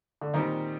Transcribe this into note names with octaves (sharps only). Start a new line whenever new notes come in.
D3
A#2 D#3 G3 C4 D#4